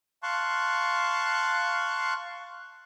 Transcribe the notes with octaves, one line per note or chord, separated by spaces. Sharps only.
F5 A5 C6 C#6 F#6